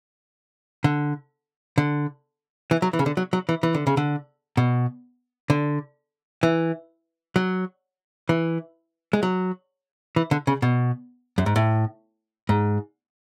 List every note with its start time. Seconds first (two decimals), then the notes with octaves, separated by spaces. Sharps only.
0.84 D3
1.78 D3
2.71 E3
2.82 F#3
2.93 E3
2.99 C#3
3.06 D3
3.17 F#3
3.33 F#3
3.49 E3
3.63 E3
3.75 D3
3.87 C#3
3.97 D3
4.57 B2
5.50 D3
6.43 E3
7.36 F#3
8.29 E3
9.13 G#3
9.23 F#3
10.16 E3
10.31 D3
10.47 C#3
10.62 B2
11.38 F#2
11.46 G#2
11.56 A2
12.49 G#2